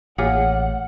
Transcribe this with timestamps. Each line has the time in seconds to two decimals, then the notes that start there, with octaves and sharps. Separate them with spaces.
0.18 A1 A#3 F4 G#4 C#5 F#5 F6 C#7